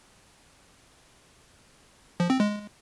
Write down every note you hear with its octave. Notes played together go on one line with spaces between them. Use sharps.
F3
C4
G#3